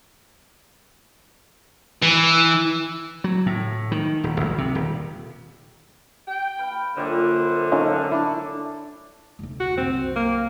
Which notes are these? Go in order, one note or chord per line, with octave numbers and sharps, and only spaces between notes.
E3
F#3
A2
D#3
D#1
A#1
C3
D#1
G5
B4 F5 B5
F#2 A#2 D3 G3 G4 C5
F#3 A3 C#4 D#4 F4 A#4
D4 E4 A4 A5
F1 D2
F#4
C2 F#2 C4
A#3